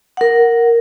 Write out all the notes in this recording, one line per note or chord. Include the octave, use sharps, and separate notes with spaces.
A#4 F#5